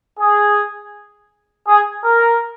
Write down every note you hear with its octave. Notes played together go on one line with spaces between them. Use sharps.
G#4
G#4
A#4